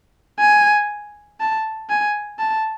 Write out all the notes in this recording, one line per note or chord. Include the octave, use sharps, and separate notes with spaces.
G#5
A5
G#5
A5